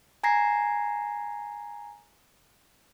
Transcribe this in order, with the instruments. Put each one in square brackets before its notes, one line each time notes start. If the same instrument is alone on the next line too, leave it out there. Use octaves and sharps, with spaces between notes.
[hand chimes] G#5 A#5 G#6 A#6 C7